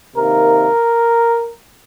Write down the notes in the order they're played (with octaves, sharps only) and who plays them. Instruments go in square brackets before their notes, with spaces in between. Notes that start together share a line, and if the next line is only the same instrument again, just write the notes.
[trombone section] C3 D#3 A#3 A#4